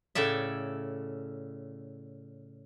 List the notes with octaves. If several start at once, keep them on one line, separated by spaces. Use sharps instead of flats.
A2 C#3 A4 D5 E5